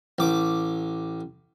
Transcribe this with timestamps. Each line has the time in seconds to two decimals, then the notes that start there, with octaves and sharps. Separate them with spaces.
0.19 A1 D6